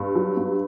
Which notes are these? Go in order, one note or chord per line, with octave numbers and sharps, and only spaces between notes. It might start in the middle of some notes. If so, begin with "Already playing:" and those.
Already playing: G2
F#3
G2